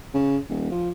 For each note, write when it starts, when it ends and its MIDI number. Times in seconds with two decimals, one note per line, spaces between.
0.14 0.38 49
0.49 0.71 27
0.71 0.90 53